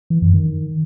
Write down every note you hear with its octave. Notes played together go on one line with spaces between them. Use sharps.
E3
F#2
D#3